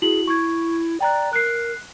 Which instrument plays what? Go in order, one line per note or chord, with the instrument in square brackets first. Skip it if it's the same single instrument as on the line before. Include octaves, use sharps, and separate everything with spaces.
[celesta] E4 F#4 F#7 [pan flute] G#4
[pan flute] E4 [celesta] C#6 G#6
[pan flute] D5 [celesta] G5 A#5 F#6
[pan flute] A#4 [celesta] F#6 C7